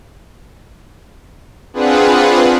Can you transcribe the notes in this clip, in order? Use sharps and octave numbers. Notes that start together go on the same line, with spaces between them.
C4 D4 F4 G#4 B4 F#5